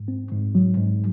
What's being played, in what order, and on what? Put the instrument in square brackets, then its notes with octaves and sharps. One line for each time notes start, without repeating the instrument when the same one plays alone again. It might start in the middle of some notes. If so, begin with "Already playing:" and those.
Already playing: [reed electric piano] G#2
C4
G#2
F#3
G#2